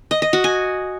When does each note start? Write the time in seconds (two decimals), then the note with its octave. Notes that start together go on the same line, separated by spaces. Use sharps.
0.11 D#5
0.22 D#5
0.33 F#4
0.44 G#5